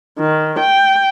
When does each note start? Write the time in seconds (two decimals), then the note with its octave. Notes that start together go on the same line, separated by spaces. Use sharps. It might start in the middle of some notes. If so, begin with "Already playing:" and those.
0.19 D#3
0.60 G5